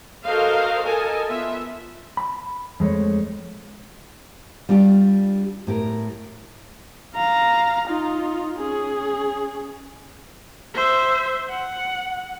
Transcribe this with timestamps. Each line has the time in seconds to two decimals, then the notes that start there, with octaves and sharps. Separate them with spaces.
0.25 F#4 A4 A#4 C5 D#5 F5
0.84 A4 A#4 D#5 G#5 A5
1.29 B3 F4 E5
2.17 B5
2.80 F2 G#3 A3 C#5
4.69 G3 D4 F4 G4
5.67 A2 G4 A#4
7.15 F5 A#5
7.88 D#4 F4
8.58 C#4 G#4
10.74 C5 E5
11.50 F#5